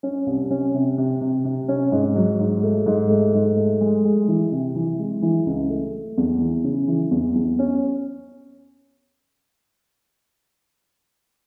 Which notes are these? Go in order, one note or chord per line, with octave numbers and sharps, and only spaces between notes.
C#4
C2
C#4
C3
C3
C3
C3
C#4
G#2
F#3
G#2
A3
G#2
A3
G#2
A3
G#3
G#3
E3
C3
E3
G#3
E3
C#2
A3
A3
E2
E3
C#3
E3
E2
E2
C#4